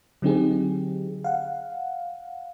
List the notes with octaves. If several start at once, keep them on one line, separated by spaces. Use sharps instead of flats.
D3 F#3 C4 D#4 G4 G#4
F5 F#5